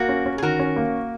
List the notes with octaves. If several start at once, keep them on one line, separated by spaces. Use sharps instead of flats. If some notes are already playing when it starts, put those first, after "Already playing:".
Already playing: A#3 F#4 A#4
C#4
C#4
G#4
D#3 F#4 A#4
C#4
A#3